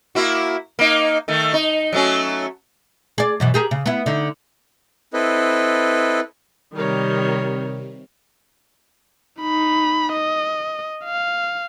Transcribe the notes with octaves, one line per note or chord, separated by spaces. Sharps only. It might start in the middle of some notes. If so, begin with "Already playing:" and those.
A#3 E4 F#4
A#3 D#4
D#3 A3
D#4
F#3 A3 C#4
G#4 D5
F#2 B2 E3
G4 G#4 A#4
C#3
B3 E4
D3 D#4
C4 E4 A4 B4 D#5
C3 D#3 G3 A#4 C#5
D#4 B5
D#5
F5